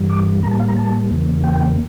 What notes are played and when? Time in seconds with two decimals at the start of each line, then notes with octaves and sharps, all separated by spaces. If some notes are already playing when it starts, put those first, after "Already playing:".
Already playing: G2 E3 G3
0.10 D6
0.43 A2 G3 A#3 A#5
0.51 A5
0.60 F5
0.68 A#5
0.77 A5
1.10 E2 C#3 E3 A#3
1.44 G5